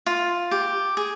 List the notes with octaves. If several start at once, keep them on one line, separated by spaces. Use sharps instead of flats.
F4
G4
G#4